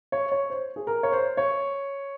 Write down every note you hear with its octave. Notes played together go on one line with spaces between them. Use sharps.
C#5
C#5
C5
G#4
A#4
C#5
C5
C#5